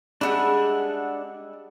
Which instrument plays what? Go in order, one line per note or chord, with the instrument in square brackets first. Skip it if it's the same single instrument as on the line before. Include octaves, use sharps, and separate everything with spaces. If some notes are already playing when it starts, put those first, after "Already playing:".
[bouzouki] G3 G#3 G#5 [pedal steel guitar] D4 E5 F#5